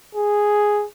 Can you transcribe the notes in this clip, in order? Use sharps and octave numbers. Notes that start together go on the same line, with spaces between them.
G#4